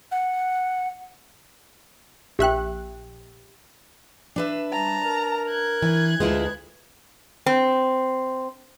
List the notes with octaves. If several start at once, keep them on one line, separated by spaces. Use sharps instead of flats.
F#5
A#1 G4 E5 G5 F#6
D4 B4 E5
G3 A5 A#5
A#4
F#6 G#6
E3
D2 G#3 E4 F4 B4 C5
C4